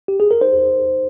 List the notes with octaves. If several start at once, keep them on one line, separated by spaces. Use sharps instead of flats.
G4
G#4
A#4
D#4 C5